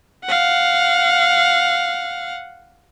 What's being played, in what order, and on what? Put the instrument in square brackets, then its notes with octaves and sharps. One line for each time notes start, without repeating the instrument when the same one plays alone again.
[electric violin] F5 F#5